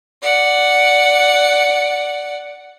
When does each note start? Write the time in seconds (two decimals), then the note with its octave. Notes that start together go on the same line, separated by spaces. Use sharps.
0.23 D5 F#5